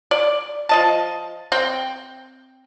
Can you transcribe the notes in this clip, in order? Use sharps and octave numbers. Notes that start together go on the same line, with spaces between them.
D5
F3 D#5 A5
C4 G5